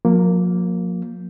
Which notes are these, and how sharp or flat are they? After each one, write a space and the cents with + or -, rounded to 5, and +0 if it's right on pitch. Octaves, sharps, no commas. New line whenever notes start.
F3 +45 A#3 +0